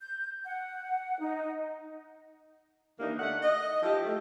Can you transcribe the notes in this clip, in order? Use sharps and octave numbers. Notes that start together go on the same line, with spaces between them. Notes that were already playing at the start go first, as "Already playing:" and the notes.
G6
F#5
D#4
D#2 E3 A#3 D4 D#4
D3 A3 F#5
D#5
F3 D#4 E4 G4
A3